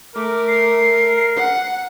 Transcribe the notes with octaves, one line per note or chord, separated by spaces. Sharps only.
A3 A#4 D6
C7
F#5